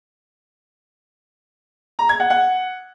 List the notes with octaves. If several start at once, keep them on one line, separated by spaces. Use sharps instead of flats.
A#5
G#6
F#5
F#5